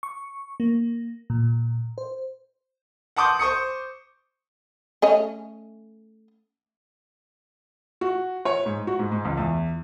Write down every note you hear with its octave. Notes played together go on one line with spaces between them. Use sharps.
C#6
A#3
A#2
C5
F#5 A5 C6 D6 D#6 G6
C5 C#6 D#6 C#7
A3 C#4 D#5
F#4
C#5
G#2
F#4
G#2
G#2
C#2
E2